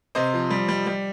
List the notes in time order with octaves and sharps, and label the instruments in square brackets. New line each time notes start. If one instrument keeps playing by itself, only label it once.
[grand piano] C3 C5 D#5
F3
G3
G3
G3